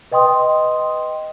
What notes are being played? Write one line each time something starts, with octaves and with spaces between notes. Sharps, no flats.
B4 D#5 G5 C6 D#6